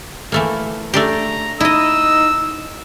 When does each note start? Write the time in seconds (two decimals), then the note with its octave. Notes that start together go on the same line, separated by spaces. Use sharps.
0.32 E3 A3 A#3
0.94 A3 D4 G4 A#5
1.60 D#4 E4 D#5 E6